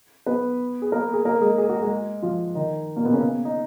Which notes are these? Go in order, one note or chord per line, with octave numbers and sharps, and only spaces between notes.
B3 B4
G#4
A#3 A#4
G#4
A#3 A#4
G#3 G#4
G#4
F#4
G#3 G#4
F3 F4
D#3 D#4
A#2 A#3
B2 B3
C#3 C#4
D#4